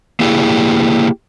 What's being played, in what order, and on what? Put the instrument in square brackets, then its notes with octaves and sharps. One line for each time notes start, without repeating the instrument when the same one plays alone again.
[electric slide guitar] A#3 E4 G4 G#4